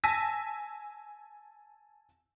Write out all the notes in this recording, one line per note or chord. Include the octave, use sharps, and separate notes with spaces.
G#5 A5 E6 A#6 B6 D#7